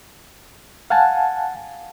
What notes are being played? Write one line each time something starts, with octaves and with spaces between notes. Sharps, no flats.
F5 F#5 G#5 A5